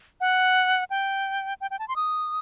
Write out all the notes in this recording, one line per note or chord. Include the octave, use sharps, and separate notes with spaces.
F#5
G5
G5
G5
A5
C6
D#6